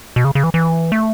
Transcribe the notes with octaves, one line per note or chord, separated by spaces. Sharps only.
B2
C#3
C#3
E3
E3
A3